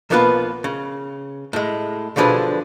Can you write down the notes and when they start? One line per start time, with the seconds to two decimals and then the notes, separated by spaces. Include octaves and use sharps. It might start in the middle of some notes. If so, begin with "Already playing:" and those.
0.10 B1 F3 A#3 B3 F4 B4
0.64 C#3
1.53 A2 G#3
2.16 G2 B2 D3 F3 G#4 B4